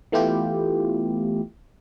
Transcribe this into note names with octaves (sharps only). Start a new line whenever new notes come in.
E3 A3 B3 E4 F4 G4